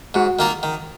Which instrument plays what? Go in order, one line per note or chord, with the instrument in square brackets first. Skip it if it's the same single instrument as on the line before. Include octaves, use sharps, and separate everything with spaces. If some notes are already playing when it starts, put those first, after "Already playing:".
[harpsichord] G#2 [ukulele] F#4
[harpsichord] D#3 A#3 F4 A#4
D#3